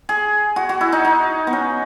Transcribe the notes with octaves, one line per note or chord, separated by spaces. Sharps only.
G#4
F#4
F#4
E4
D#4
D#4
B3
C#4